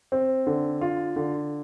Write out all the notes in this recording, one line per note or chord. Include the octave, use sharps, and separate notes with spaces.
C4
D3
F4
D3